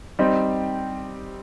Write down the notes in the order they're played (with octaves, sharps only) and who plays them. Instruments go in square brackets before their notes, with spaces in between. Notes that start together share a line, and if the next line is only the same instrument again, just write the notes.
[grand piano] G3 C4 D#4 G4